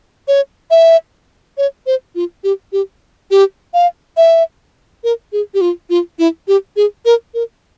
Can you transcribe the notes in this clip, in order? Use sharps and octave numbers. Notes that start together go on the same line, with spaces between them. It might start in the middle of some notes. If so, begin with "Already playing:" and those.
C#5
E5
C#5
C5
F4
G4
G4
G4
F5
E5
A#4
G#4
G4
F4
F4
E4
G4
G#4
A#4
A#4